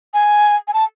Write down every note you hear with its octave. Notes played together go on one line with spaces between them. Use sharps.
G#5
G#5
A5